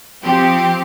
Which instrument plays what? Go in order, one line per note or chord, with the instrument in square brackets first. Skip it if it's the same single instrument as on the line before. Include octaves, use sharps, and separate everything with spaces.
[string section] F3 C4 G4